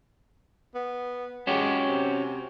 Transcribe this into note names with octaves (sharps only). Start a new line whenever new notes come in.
B3
G#3 C#4 F#4 G4
C3